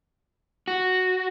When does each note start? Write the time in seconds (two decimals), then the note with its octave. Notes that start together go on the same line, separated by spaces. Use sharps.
0.68 F#4